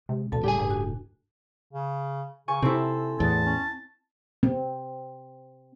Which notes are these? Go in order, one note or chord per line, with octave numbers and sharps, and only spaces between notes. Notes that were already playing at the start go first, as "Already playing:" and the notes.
C3 G#3
D2 B2 E3 A4 A5
D1 A2 C#3 G3 G4 G#4 G#5
G2
F#4
C#3
C#3 G#5 C#6
C3 C4 E4 A4
E2 A2 A5
C#4
C4